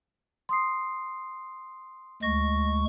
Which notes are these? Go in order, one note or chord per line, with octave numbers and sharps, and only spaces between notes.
C6 D#6 C7
D2 G#3 C#6 A#6